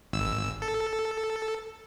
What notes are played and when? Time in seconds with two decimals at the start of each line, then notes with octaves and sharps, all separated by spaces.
0.13 G#1 E6
0.62 A4